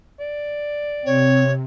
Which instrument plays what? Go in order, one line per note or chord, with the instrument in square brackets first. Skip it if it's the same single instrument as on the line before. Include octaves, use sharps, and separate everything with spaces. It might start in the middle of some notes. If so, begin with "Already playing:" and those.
[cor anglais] D5
[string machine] C3 [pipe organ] C4 [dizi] C#5